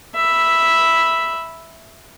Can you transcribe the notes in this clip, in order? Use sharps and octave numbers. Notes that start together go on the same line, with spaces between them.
E5 B5